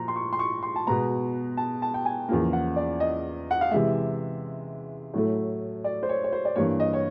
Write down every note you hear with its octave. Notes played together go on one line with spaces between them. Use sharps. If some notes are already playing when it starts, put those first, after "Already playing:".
Already playing: A#2 F3 A#5
C6
C#6
C6
C#6
C6
A5
B2 G#3 B3 A#5
A5
A5
G5
G#5
E2 C#3 F3 A#3
F#5
D5
D#5
F#5
F5
C3 E3 G#3 E5
A2 F#3 A3
D5
C5
C#5
C#5
C5
D5
G2 E3 G3 A#3 C#5
D#5
C#5